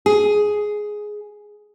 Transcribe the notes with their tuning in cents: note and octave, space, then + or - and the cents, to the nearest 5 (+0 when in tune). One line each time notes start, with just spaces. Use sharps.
G#4 +5